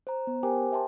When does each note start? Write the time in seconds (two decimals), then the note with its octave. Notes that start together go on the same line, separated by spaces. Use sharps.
0.07 C5 A#5
0.27 B3
0.43 G4 A#4 C5 G5 G#5 D6
0.72 E5 G5 A5 C6